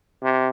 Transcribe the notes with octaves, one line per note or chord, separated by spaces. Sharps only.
C3